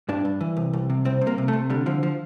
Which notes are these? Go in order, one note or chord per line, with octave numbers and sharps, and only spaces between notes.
G2 D4
G2
E3
C2
C2
C3
C2 C4
C3
A#3
C3
A3
C3
D3 G3
D3 F3
F3